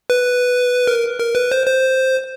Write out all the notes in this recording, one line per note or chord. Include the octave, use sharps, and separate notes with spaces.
B4
A#4
A#4
B4
C5
C5